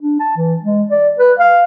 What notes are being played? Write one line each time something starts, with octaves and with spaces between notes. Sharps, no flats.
D4
A5
E3
G#3
D5
B4
F5